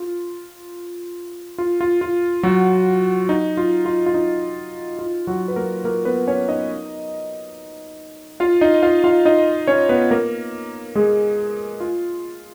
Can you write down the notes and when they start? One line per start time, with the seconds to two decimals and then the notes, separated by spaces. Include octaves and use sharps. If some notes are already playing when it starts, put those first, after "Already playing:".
Already playing: F4
1.58 F4
1.81 F4
2.01 F4
2.43 F#3 F#4
3.29 D#4
3.57 F4
3.86 F4
4.06 F4
4.14 D#4
4.99 F4
5.27 F#3 F#4
5.48 B4
5.56 A#3 A#4
5.84 A#3 A#4
6.05 B3 B4
6.27 C#4 C#5
6.48 D#4 D#5
8.40 F4 F5
8.61 D#4 D#5
8.83 F4 F5
9.04 F4 F5
9.25 D#4 D#5
9.67 C#4 C#5
9.89 B3 B4
10.11 A#3 A#4
10.95 G#3 G#4
11.80 F4